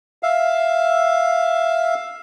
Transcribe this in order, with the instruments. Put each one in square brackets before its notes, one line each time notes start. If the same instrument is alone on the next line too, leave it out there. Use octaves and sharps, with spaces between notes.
[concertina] E5 F5